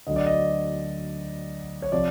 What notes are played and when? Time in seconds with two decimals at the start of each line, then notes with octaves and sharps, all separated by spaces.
0.07 D2 D3 F#3 D#5
0.16 D5
0.26 D#5
1.82 C#5
1.92 C3 F3 D5